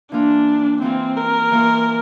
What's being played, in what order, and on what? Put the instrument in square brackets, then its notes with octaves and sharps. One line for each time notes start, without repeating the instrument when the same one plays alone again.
[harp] E3 A#3 F4 [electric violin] D4
[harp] E3 A#3 F4 [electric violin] C4
[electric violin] A#4
[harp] E3 A#3 F4